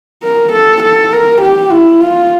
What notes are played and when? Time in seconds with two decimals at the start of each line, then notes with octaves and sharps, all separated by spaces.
0.23 A#4
0.52 A4
0.83 A4
1.13 A#4
1.41 G4
1.71 E4
2.00 F4